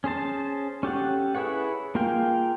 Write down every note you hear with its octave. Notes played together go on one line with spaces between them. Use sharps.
C#4 G#4 C5 A5
C#4 G4 A4 F#5
E4 G#4 B4 C#5 F#5
A#3 F4 G#4 F5 G5